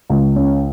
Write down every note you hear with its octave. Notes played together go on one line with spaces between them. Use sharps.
C#2
C#4